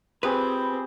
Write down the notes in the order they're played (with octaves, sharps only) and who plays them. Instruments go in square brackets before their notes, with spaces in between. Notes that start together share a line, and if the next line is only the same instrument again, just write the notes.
[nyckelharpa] C4 [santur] F4 G4 G#4 [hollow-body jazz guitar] B4 [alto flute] B5